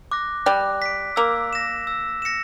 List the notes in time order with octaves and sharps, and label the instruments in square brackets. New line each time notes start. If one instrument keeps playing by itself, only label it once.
[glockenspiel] D6 F#6 A#6
[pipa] G3 [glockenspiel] F#6
[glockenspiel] B6 D7
[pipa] A#3 [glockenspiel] E6
[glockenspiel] A#6 E7
E6
A#6 C#7 E7